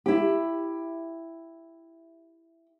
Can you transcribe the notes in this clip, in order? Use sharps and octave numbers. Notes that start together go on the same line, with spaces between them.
E4 G4